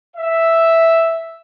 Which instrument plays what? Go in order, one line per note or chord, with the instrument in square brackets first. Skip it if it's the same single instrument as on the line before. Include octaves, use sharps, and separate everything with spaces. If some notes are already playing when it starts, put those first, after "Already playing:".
[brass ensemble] E5